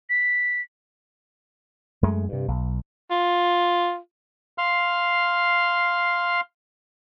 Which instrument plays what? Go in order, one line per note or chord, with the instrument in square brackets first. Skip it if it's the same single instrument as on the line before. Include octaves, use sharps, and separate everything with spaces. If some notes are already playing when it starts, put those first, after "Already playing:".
[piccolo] B6
[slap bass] F#2 G#3 A3
G2 C3
B1
[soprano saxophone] F4
[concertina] F5 C6 F6